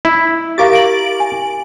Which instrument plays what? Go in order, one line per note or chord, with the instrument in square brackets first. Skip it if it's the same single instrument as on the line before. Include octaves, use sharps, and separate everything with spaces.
[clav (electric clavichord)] E4
[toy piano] G4 F5 [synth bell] A#4 D6 A6
[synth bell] D7 F#7
[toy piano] G#5